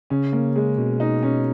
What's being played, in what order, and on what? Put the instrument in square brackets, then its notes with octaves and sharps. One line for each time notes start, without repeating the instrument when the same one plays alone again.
[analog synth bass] C#3 [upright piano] C#4
[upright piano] A#3
G#3
[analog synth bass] B2
[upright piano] D#4
C#4